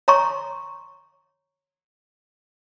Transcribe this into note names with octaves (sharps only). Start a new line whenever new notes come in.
C#5 A#5 C6 C#6